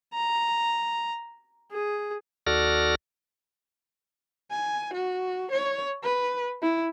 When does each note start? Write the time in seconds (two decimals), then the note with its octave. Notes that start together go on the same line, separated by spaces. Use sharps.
0.14 A#5
1.72 G#4
2.47 D#2 F#4 A4 D5 F6 A#6
4.51 G#5
4.94 F#4
5.52 C#5
6.03 B4
6.62 E4